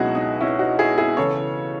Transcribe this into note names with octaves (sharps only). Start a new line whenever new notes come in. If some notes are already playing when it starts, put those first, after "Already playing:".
Already playing: C#2 B2 F#3 D#4 E4 F#4 G#4
D#4
C#4 E4
D#4 F#4
E4 G#4
E4 G#4
C#3 E3 A4 C#5